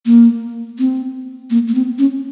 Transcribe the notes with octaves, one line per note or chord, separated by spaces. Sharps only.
A#3
C4
A#3
A#3
C4
C#4